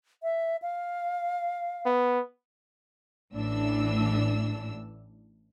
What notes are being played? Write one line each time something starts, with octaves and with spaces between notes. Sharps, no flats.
E5
F5
B3
A1 A2 E3 D4 E6